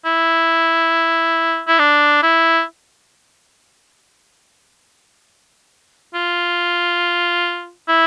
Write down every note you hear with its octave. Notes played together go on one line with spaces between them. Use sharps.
E4
E4
D4
E4
F4
E4